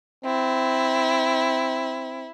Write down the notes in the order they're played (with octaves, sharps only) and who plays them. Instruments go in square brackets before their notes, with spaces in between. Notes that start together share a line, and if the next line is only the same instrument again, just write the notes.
[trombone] C4 [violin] E4